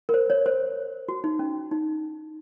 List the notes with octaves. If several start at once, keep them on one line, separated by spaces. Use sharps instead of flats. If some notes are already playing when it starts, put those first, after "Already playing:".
A#4
C5
C#5
C5
F#4
D#4
C#4
D#4